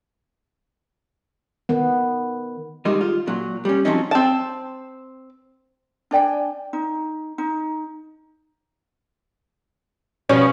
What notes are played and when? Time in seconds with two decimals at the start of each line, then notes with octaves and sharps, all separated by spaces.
1.69 D#3 B3
2.85 D#3 G3 G#3 D#4
3.01 F4
3.27 A#2 F#3
3.65 G3 C#4
3.85 F3 F#3 C4 C#4 D#4
4.11 C4 A5
6.11 D4 D5 G5 G#5
6.73 D#4
7.38 D#4
10.29 B2 F3 G3 C#4